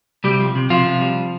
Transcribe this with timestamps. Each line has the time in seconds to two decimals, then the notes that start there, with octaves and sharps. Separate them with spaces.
0.24 C3 G3 G4
0.40 F3
0.55 C3
0.70 C3 F3 F4
0.85 C3
1.01 G3